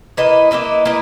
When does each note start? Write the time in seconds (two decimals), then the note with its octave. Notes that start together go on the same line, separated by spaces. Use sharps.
0.17 A#3 E4 B4 D#5
0.51 A#3 E4 B4 D#5
0.85 A#3 E4 B4 D#5